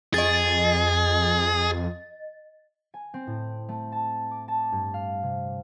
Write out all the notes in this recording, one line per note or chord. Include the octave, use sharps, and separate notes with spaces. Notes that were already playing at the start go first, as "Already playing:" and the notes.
F2 G#4 D#5 A6
G#5
C4
A2
A3
A5
D6
A5
G2
F5
C3